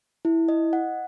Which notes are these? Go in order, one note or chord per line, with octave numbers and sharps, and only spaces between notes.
E4
D#5
F#5